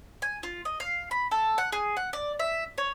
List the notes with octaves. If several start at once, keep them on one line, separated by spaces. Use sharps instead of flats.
G#5
F4
D#5
F5
B5
A4
F#5
G#4
F#5
D5
E5
C#5